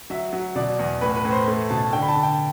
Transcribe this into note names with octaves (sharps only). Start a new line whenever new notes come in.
F#3 E5
F#3
B2 D5
E2
A2 B4
B4
A2
C5
A3
B2 A5
D3 G5
B5
A5
D3
G5